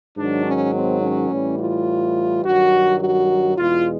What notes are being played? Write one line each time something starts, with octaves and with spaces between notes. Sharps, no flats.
G#2 D#3 F#3 D4
C#4
C4
C#4
A2 E3 G3
F4
G2 D#3 F#3 F#4
F#4
E2 B2 G#3 F4